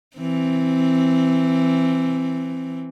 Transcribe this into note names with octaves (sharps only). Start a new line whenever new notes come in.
E3 C4